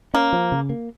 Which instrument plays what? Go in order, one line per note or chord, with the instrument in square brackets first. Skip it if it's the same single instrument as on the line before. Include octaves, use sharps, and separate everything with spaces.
[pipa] A#3 [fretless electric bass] C#4
[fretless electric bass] F3
C#3
A#3